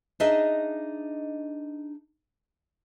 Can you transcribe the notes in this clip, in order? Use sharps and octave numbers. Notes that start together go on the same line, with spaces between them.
D4 D#4 G#4 D#5 E5